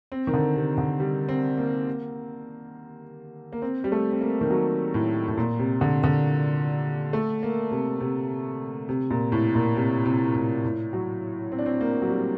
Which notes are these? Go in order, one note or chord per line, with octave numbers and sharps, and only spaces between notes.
C4
D#3
D3
C3
D3
G3
C4
A#3
A#3
C4
G3
A3
C4
A#3
D#3
F#3
A2
A2
A#2
C3
D3
D3
A3
A#3
C3
C3
C3
A#2
A2
A#2
C3
C3
A2
A2
F#3
C4
D4
C4
A#3
F#3
G3